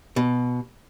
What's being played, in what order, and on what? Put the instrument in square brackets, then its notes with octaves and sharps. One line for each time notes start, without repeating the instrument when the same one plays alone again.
[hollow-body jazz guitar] B2